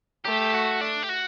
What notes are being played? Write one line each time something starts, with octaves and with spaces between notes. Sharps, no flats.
A3 G4
F#4
D4
G4
F#4